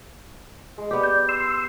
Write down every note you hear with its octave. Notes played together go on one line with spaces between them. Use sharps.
G#3
B3 G4 D5
G6
C6 E6